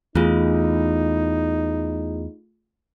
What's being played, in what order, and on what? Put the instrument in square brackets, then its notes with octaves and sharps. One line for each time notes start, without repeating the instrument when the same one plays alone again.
[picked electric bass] E2 [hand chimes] A3 F4 G#4 [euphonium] D#4